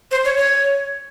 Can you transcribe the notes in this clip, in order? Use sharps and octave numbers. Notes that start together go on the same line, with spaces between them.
C5
C#5
C#5